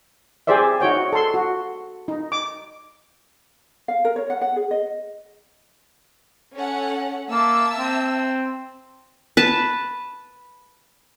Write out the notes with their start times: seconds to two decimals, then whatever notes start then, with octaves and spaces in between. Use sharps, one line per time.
0.47 G4 G#4 C5 D5 E5
0.81 D#4 F#4 C#5 G5
1.13 A4 C6
1.34 F#4
2.08 D#4
2.32 D6
3.88 F5
4.05 A#4
4.16 C#5
4.30 F#5
4.41 F#5
4.56 G#4
4.71 D#5
6.55 C#4 A4 F#5
7.30 A#3 E5 A5 E6
7.79 C4
9.37 B4 A5